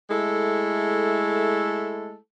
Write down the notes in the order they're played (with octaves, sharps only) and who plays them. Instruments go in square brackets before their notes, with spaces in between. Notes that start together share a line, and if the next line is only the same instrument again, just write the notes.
[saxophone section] G#3 A3 E4 A4